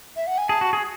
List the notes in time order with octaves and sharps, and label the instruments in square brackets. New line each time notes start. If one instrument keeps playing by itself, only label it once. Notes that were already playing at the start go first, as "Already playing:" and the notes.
[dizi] E5
F#5
G#5
[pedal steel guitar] G#4 [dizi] A5
[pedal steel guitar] F#4
G#4